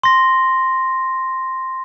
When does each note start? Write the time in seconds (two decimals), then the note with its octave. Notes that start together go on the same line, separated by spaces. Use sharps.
0.04 C6 A#6